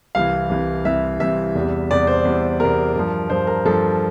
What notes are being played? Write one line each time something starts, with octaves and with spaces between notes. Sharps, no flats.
C2 C3 E3 F5
C2 C3 E3
C2 C3 E3 E5
C2 C3 E3 E5
E2 C3 G3
E2 C3 G3 D5
C5
E2 C3 G3
E2 C3 G3 A#4
G2 F3
G2 F3 C5
A#4
G2 F3 A4